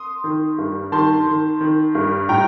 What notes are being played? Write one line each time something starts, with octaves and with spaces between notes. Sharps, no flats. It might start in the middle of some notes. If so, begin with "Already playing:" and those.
Already playing: C6 D#6
D#3
G2
D#3 A5 C6
D#3
D#3
G2
A2 G5 A#5